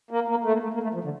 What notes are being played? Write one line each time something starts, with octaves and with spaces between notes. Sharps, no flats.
A#3
A#3
A3
A#3
A3
A#3
A3
F3
D3